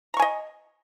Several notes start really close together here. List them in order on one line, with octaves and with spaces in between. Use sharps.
A#5 C#6 G#5 D#5